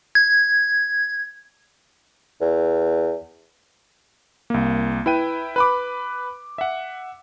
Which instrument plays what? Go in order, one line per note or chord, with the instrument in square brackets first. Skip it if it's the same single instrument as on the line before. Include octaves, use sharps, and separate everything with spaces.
[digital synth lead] G#6
[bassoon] E2
[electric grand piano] C2 A#3
E4 B4 G5 D#7
B4 B5 D6
E5 F#5